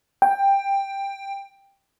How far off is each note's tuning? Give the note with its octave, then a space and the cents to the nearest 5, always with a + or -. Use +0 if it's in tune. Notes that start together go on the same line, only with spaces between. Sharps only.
G5 +10